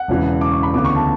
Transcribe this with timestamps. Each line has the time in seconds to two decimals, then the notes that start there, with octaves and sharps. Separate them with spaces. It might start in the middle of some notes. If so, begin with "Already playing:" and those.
Already playing: F#5
0.08 E1 E2 C#3 E3
0.41 D6
0.52 C#6
0.63 B5
0.74 D2 C#3 E3 B3 D6
0.85 C#6
0.95 A5